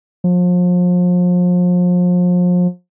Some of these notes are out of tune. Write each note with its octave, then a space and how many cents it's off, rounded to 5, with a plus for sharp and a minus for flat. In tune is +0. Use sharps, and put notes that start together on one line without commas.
F3 +35